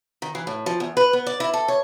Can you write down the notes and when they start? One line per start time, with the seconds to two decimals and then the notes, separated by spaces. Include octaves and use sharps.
0.22 D#3
0.35 E3
0.47 A2
0.66 F3
0.80 E2
0.97 B4
1.13 B3
1.27 D5
1.40 E4
1.54 A4
1.68 C#5